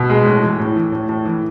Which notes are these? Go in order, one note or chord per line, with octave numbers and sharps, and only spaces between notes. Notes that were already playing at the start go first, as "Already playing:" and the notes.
Already playing: B2
G#3
A2
E3
A2
E3
A2
A2
E3